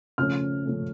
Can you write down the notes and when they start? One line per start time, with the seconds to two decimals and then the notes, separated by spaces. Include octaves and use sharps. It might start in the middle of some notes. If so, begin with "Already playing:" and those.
0.18 C#3 F3 A3 C#4 F6
0.66 C#3 F3 A3 C#4